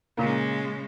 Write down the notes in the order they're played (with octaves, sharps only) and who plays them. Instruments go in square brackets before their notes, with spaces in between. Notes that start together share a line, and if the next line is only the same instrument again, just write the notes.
[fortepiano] A#2 A#3 [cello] C#3 G#3